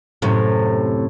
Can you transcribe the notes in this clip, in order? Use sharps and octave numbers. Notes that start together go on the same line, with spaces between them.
F#2 A2 C3